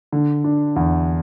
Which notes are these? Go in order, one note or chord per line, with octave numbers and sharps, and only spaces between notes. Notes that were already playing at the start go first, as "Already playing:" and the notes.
D3
D4
E2